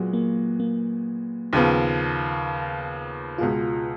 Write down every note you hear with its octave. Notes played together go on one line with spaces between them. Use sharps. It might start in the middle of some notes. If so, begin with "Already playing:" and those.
Already playing: A#2 F#3 G#3 B3 F#4
A#3
A#3
D#2 C#3 F3 B3
C#2 B2 G#3 F4